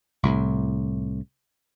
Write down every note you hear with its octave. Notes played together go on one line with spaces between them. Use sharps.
C2 A2